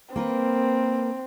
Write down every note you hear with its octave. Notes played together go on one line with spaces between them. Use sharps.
A#3 C4 A#4 B4